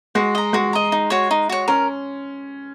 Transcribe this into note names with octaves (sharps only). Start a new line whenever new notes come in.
G#3 F#4
D#5 A#5
G#3 F#4
D#5 A#5
D#4
F#4 C#5
D#4
F#4 C#5
C#4 A#4